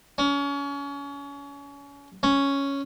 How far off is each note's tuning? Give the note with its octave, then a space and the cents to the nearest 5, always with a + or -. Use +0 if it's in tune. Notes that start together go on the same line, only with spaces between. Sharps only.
C#4 +30
C#4 +0